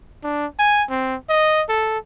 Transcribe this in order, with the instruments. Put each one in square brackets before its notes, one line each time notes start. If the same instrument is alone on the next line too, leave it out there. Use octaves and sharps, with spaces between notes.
[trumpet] D4
G#5
C4
D#5
A4